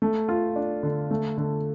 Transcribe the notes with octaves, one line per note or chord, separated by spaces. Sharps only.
A3
F4
D4
D3
A3
D3